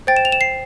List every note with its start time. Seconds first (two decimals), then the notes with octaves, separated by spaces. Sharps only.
0.07 C5 G5 A6
0.16 E7
0.25 F7
0.32 E7
0.41 C7